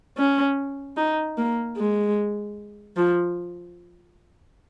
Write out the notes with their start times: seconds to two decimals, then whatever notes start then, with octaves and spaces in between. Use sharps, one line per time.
0.18 C#4
0.97 D#4
1.38 A#3
1.78 G#3
2.96 F3